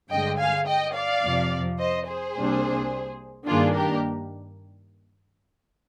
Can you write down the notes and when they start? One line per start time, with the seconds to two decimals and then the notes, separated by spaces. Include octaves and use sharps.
0.11 G2 D3 G#3 D#5 G5
0.39 F5 G#5
0.67 D#5 G5
0.95 D5 F5
1.23 F2 C3 F3
1.79 C5 D#5
2.06 G#4 C5
2.35 C2 C3 G3 A#3 D4
3.47 G2 D#3 A#3 D4 F4 G#4
3.75 G4 A#4